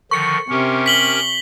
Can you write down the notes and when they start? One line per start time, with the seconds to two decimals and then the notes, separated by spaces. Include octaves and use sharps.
0.11 D3 D#3 F3 C#6 C#7
0.50 C3 C#4 G4 A#4
0.86 B6 F#7 G7